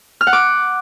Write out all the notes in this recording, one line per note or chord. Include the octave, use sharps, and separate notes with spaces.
F6
F#5
D6